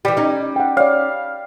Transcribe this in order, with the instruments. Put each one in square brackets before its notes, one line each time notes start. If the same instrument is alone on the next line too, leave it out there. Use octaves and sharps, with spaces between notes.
[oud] E3 G4 [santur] G3
[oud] C#4 D#4
[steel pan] F#5 G5
[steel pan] C#5 D5 [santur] F5